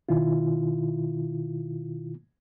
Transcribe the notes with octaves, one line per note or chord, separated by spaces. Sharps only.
B2 D#3 E4 F4